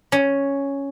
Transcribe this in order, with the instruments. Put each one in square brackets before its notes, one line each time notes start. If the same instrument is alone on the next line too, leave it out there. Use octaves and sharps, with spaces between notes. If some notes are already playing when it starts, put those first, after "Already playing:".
[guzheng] C#4